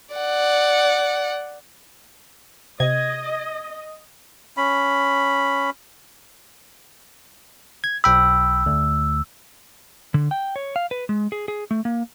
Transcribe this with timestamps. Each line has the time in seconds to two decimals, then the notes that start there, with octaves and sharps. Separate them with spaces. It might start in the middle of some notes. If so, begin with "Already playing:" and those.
0.15 D5 F#5
2.80 C3 D#5 G#6
4.57 C#4 B5
7.84 G#6
8.04 B1 G5 B5 E6
8.66 D2
10.14 D3
10.31 G5
10.56 C#5
10.76 F5
10.91 B4
11.09 G#3
11.32 G#4
11.48 G#4
11.71 A3
11.85 A#3